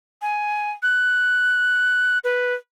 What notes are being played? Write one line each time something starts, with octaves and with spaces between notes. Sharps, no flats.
G#5
F#6
B4